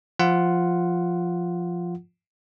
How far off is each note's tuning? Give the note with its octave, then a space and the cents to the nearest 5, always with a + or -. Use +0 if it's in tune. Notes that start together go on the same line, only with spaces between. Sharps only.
F3 +0 F4 +0 F#5 +0